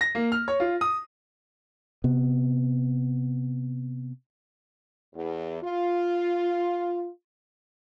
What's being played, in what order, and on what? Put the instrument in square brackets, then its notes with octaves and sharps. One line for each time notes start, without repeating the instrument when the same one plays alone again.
[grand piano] A#6
A#3
F6
C#5
F4
D#6
[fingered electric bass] C3 B3
[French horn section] E2
F4